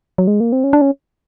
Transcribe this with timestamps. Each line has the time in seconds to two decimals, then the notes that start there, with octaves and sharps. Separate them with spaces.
0.18 F#3
0.27 G#3
0.40 A#3
0.52 C4
0.64 C#4
0.73 D4
0.81 C#4